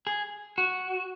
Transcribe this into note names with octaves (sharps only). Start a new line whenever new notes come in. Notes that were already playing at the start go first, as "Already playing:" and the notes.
G#4
F#4